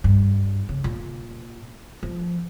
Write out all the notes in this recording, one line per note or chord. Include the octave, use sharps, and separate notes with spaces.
G2
C#3
A#2
F3